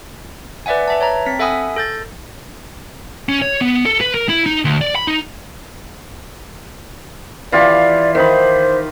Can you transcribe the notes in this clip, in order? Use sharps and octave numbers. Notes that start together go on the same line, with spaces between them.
B4 D5 E5 F#5 G#5
B4 E5 A5
C#5 A5 A#5
C4 B6
A4 E5 F#5 G#5 B5 D#6
A4 G6 A6
C#4
C#5
B3
A4
B4
A#4
E4
D#4
D2
D5
B5
D#4
E3 F4 G4 D5
D#3 D#4 C5 B5